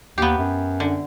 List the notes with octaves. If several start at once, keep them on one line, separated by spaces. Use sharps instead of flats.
D#2 B3 G4
F#2
D3